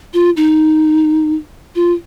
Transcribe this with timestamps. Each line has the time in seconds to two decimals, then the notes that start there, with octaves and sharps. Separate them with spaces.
0.14 F4
0.37 D#4
1.75 F4